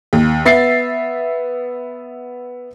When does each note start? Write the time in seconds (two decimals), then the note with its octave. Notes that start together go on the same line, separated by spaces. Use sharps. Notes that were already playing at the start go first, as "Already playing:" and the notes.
0.13 D#2
0.45 B3 E5 A6 C7